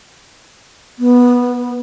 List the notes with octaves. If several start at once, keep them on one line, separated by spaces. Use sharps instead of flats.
B3